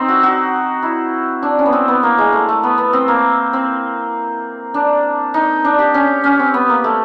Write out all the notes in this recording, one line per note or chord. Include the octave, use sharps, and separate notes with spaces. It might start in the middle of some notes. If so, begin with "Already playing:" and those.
Already playing: C4 D#4
F#4
F#4
E4
D4
C#4
B3
C4
B3
A#3
G#3
A3
A3
B3
B3
C4
A#3
C4
D4
D#4
D4
G4
C#4
C#4
C4
B3
A#3
A3